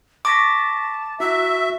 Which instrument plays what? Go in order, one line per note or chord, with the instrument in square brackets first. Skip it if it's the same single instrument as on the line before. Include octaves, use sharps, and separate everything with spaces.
[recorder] A5 [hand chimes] C#6 A#6 B6 [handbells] D6
[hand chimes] E4 [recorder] F#4 [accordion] E5